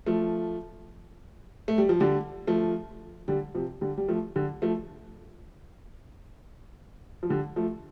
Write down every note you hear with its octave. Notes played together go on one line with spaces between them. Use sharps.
F3 A3
A3
G3
F3
D3 G3
F3 A3
D3 G3
C3 F3
D3 G3
G3
F3 A3
D3 G3
F3 A3
F3
D3 G3
F3 A3